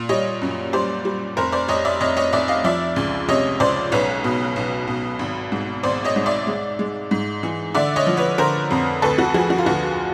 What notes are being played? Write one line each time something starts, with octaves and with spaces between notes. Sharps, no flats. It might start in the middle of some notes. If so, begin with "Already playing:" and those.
Already playing: A#2
G3 C#5 D#5
F#2
G3 C5 D5
G3
F1 A#4 C5
C5 D5
F1 C#5 D#5
D5 E5
F1 C#5 D#5
C#5 D#5
F1 D5 E5
D#5 F5
F3 D5 E5
C#2
C3 C#5 D#5
C#2 C5 D5
B1 B4 C#5
B2
B1
B2
G#1
G#2
G#1 C5 D5
C#5 D#5
G#2
D5 E5
G#3
G#3
G#2
E3
D3 D5 E5
C#5 D#5
F3
B4 C#5
D3 A#4 C5
F2
D2 A4 B4
F#4
F3 F#4 G#4
F#4
F4
D2 F#4